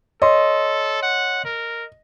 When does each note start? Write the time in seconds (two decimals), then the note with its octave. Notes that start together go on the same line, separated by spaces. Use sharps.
0.22 A4 C#5 D#5 C6
1.03 F#5
1.45 A#4